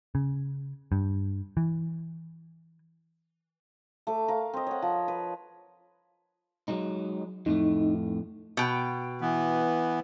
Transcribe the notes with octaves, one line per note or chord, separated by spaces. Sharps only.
C#3
G2
E3
A3 D6
A#4 F5
C4 D#5
C#5 F#5
F3
B4
F#3 G#3 D#4
F2 A2 A3 D#4
B2 G5
E3 B3